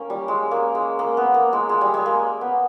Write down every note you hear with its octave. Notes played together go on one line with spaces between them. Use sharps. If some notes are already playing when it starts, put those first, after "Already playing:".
Already playing: A#3 C#4
G3
G#3
A#3
G#3
A#3
B3
A#3
G#3
G#3
G3
G#3
A#3
B3